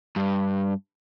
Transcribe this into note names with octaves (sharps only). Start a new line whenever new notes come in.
G2